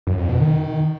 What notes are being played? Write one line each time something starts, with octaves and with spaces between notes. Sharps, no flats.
F#2
F2
B2
D#3